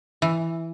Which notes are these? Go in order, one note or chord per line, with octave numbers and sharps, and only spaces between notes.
E3